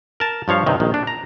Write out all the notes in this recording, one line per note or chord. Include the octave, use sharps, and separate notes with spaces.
A#4 A5
G2 F3 C#5 F5
G2 C3 D#3
A#1 D#3
D4
A#5